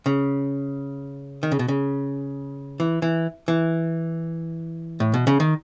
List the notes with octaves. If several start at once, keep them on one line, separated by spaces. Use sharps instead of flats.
C#3
D#3
C#3
B2
C#3
E3
E3
E3
A2
B2
C#3
D#3